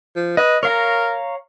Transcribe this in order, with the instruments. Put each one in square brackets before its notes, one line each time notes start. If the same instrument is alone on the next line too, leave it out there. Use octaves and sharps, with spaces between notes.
[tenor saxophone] F3
[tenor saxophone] B4 [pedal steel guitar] D#5
[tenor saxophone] A#4 [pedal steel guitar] C#5 F5 A#5